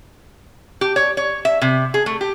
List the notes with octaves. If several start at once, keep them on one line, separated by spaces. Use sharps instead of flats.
G4
C#5
C#5
E5
C3
G#4
A3
G4